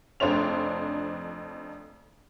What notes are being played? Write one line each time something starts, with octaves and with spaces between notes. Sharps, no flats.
F1 F2 D4 C5 C#5 F7